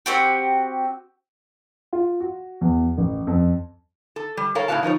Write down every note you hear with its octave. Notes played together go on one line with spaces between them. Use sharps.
C4 F#4 G4
F4
F#4
E2
A1
F2
A4
G3
A4 A#4 C#5 F5
A2 C#3 G3 F#4 F5 A5
F3 D#4 A#4 C#5